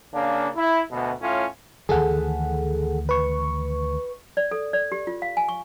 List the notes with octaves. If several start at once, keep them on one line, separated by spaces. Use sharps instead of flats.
C#3 A#3 D4
E4
D2 B2
A2 C#4 F4
D2 D#3 E3 G#4 A4 F#5
B4 C#6
D5
A4
D5
G4
F4
F5
G#5
C#6